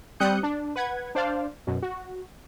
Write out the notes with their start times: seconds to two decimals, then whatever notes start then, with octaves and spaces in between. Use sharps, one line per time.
0.20 G3 C4 D#6 F#6 G6 C#7
0.43 D4
0.76 B4 F#5 G#6
1.15 D4 C5 D5 F5
1.67 F#2 B2
1.83 F#4